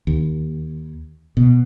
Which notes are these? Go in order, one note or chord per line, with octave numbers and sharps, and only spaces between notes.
D#2
B2